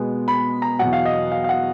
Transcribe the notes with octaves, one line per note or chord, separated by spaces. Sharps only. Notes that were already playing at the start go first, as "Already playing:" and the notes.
Already playing: B2 G#3 B3
B5
A#5
E2 B2 F#3 F#5
F5
D#5
F5
F5
F#5